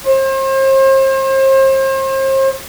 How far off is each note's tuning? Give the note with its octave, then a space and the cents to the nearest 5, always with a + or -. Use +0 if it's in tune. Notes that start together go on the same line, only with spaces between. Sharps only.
C5 +40